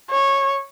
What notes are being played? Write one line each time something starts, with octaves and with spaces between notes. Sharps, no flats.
C#5